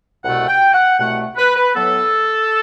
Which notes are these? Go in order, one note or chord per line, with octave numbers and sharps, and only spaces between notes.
C2 B2 A3 F#5
G5
F#5
C2 B2 A3 F#5
B4
B4
A2 F#3 B3 A4